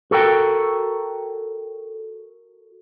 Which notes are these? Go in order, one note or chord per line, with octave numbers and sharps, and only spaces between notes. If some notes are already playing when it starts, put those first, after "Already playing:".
F#4 A4 A#4 G5